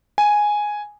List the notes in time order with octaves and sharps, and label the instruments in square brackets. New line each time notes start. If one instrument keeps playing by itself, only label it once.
[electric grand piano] G#5